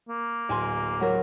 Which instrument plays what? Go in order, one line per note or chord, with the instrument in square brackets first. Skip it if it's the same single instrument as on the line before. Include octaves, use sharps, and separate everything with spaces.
[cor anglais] A#3
[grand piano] D1 G#5 C6
[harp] F#3 A#4